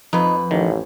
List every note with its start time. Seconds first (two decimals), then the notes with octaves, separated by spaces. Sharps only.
0.13 F2 F3 D#4 B4
0.51 A1 D#3